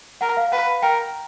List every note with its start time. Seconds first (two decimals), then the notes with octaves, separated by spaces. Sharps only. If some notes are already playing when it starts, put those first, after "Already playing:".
0.21 A#4 F#5
0.37 F5
0.52 B4 F#5
0.82 A#4 G5